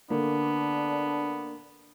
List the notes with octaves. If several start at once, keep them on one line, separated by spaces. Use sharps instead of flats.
D3 A#3 B3 D4